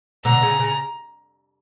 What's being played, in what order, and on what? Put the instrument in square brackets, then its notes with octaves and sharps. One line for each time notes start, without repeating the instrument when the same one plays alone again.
[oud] B2 D3 [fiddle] A#5
[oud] C#3
C#3